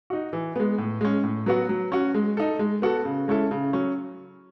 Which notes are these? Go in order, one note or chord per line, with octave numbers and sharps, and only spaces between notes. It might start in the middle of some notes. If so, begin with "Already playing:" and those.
D#4 F#4
E3
G#3 B3
A2
G#3 C#4
A2
F#3 B3 F#4
F#3
C#4 F#4
G#3
D#4 A4
G#3
B3 F#4 A4
C#3
G#3 C#4 E4 A4
C#3
F#3 C#4